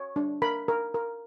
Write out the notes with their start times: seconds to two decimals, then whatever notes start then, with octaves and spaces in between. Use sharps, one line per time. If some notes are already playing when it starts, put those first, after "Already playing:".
Already playing: C#5
0.16 D4
0.42 A#4 B5
0.68 A#4
0.94 A#4